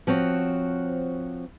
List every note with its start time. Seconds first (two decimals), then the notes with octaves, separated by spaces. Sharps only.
0.07 F3 C4 F#4 C#5